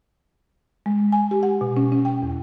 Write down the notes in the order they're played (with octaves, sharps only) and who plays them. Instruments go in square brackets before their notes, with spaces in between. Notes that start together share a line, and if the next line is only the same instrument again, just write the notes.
[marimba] G#3
G#5
G4
F#5
B2
C#4
C#4
G5
E2